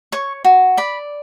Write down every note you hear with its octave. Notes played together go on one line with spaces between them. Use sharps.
C#5 C#6
F#4
D5 B5